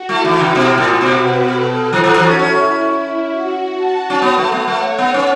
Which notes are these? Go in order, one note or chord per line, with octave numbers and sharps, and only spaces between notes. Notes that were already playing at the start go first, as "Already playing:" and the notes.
Already playing: F#4
A3 E4
E3
C#3
B2 F#4
A2
B2 B4
A4
E3 F#4
E3
E3
C#4
C#4 E4
F#4
A5
C#4
B3 F#5
A3
B3
A3 C#5
B3
C#4